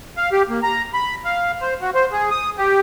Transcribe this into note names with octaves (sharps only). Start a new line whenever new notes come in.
F5
G4
A#3
A#5
B5
F5
C5
F#4
C5
G#4
D#6
G4